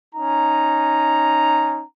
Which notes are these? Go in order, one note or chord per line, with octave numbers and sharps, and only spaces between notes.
C#4 D#4 A#5